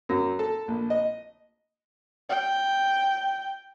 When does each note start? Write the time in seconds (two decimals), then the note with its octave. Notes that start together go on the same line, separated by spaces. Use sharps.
0.09 F#2
0.39 A4
0.68 A#1
0.90 D#5
2.29 G5